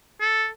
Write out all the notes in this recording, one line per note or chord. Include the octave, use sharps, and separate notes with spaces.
A4